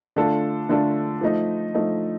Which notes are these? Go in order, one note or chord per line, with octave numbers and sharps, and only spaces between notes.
D3 A3 D4 F4 A4
D3 A3 D4 F4 A4
F3 A3 D#4
F3 A3 D#4